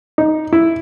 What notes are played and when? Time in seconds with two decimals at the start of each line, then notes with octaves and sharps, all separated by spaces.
0.18 D#4
0.53 E4